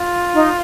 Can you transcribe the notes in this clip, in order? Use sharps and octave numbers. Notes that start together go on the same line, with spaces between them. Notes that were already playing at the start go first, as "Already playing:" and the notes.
Already playing: F4
D#4